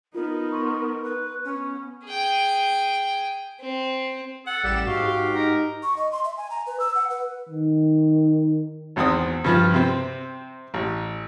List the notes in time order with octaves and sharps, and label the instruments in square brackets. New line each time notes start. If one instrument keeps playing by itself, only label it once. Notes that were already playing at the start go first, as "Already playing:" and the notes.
[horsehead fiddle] B3 D#4 [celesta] F4 [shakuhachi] A#4
[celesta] C6 C#6
[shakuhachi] B4
[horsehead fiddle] B3 [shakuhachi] C#4
[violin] G#4 G5
C4
[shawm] A4 [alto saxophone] F#5
[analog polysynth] A1 G4 E7 [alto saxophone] G3
[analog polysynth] G#2 [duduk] F#4 [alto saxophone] G4 [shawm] F5
[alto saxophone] G4
[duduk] D#4 [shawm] A#4
[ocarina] C#6
D#5
C6
E5
G#5
A#5
B4
E6
F#5
B4
[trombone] D#3
[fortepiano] G#1 E2 C4 D#6
G2 F3 F4
C3 C4
A1